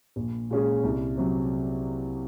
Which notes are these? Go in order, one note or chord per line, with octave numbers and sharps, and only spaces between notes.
A#1
A#2 G#3 C#4 G#4
C2
C3 F#3